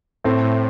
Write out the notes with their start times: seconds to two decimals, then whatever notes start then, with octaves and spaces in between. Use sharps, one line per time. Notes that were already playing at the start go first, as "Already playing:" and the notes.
0.24 A2 A3 C4
0.44 A2